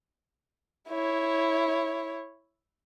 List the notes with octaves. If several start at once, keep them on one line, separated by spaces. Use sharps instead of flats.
E4 C#5